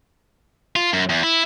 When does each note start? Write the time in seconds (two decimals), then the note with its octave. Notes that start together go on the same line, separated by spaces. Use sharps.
0.76 F4
0.93 F#2
1.09 E2
1.23 E4